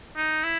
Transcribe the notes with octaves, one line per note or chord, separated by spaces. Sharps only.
D#4
E4